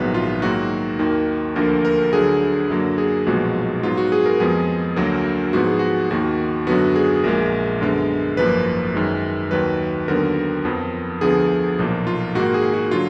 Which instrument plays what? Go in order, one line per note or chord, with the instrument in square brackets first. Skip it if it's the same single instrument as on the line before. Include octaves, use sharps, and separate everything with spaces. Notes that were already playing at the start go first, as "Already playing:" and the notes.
Already playing: [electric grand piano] A#1 G#2 D#3 F#3 B3 B4
F4
G#2 D#3 F#3 A#3 F#4
D#2 D#3 A#3
D2 D3 F3 A#3 A#4
A#4
D2 D3 F#3 G#4
F#2 D3 F#3 A#3
G#4
B1 A#2 F3 G#3 B3 F#4
G#2 F#3 B3 F4
F#4
G#4
A#4
F2 F3 G#3 B3 G#4
D2 D3 F#3 A#3 A#4
G#2 F3 B3 F#4
G#4
F#4
D#2 D#3 A#3 F#4
F#2 D3 F#3 B3 F#4
G#4
A#1 A#2 G#3 A#4
F#2 D3 G#3 B3
G#1 F#2 F3 A#3 B4
F#2 D#3 G#3
D#2 D#3 F#3 B4
D#2 D3 F#3 B3 A#4
F2 F3 B3
D2 D3 F3 B3 G#4
B1 A#2 F3 A#3
F4
G#2 D#3 A#3 F#4
G#4
F#4
D3 F#3 F4